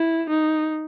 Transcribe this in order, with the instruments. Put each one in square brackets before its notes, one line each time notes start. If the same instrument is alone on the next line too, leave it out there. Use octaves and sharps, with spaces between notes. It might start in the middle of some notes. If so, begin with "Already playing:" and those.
Already playing: [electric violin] E4
D#4